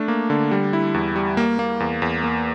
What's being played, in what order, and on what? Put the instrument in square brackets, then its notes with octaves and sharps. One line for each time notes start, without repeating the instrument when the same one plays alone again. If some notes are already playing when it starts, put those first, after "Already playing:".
Already playing: [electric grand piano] A3 D4
A#3
D3
G3
E4
E2
G3
A#3
A#3
E2
E2
A#3